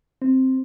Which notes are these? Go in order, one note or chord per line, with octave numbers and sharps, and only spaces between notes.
C4